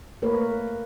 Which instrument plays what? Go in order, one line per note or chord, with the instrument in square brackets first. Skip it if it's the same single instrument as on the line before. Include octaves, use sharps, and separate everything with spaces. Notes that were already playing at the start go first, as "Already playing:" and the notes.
[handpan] A3 A#3 A#4 B4 C#5